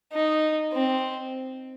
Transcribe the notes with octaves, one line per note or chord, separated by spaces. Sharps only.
D#4
C4